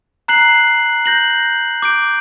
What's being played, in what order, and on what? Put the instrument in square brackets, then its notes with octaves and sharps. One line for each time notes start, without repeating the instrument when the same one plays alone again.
[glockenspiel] A#5 F#6 C7 F#7
G6 A#6 F#7
D6 G6 D7